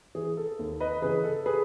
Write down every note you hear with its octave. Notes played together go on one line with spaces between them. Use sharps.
E3 G#4
A4
D#2
B4 D#5
C#3 E3 G#4 B4
A4
G#4 B4